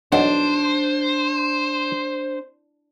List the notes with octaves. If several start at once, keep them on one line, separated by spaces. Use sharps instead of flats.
B1 D4 C5 F#5